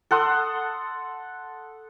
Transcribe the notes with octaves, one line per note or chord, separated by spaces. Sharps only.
A4 F#5 C6 D#6